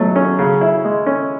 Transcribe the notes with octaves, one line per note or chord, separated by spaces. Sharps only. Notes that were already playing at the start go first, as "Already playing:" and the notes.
Already playing: B2 F#3 A3
C#4
C#3
E4
G#3
C#4